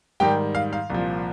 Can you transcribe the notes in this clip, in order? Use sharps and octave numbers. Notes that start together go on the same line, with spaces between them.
G#2 D#3 G3 G4 G5
F5
F5
C2 A#2 F3